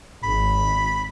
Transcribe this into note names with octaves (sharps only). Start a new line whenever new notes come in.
G#1 B5